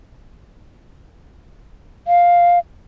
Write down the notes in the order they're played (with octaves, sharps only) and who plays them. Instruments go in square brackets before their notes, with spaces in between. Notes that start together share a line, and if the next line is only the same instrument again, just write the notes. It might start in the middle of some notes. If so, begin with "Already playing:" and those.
[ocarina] F5